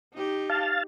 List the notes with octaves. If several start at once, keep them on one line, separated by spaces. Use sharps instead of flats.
D#4 G4
F5 A5